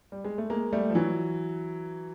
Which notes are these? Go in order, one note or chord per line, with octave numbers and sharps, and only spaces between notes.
G3
G#3
A3
G#3 A#3
G3 A3
F3
E3 F#3